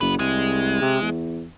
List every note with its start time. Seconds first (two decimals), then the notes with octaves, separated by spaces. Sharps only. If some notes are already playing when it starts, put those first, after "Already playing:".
0.01 F#1 B3 B4
0.19 C2 G#3
0.81 C3
1.02 E2